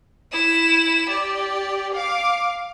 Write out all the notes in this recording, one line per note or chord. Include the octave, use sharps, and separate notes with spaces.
E4 E7
G4 D5
F5 D6